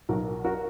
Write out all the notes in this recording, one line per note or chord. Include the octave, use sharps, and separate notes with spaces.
B1 F#4 A#4
F#4 A#4